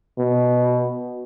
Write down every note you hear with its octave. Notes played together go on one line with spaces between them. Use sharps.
B2